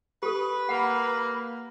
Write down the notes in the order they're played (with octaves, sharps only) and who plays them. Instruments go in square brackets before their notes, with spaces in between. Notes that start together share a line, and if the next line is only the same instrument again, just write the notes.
[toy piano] G4 A4 [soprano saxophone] B4
[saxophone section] A#3 [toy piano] F#5 B5